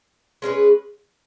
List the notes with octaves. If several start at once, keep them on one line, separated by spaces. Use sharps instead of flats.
G#3 C#4 G#4 B4